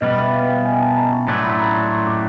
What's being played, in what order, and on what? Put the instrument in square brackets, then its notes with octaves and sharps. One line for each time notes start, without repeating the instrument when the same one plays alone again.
[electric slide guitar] B2 G3 B3 [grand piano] D#5
[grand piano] E5
F5
G5
G#5
A5
A#5
C#6
[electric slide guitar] A2 F#3 A3 D4 [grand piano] C6
[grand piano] B5
A#5
C6
C#6
D6